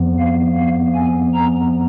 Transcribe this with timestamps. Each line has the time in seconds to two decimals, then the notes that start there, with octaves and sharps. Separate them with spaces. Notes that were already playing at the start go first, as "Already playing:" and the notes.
Already playing: F2 F3 B3
0.19 F5
0.57 F5
0.95 G#5
1.33 A#5